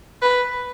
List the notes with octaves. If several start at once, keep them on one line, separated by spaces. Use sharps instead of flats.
B4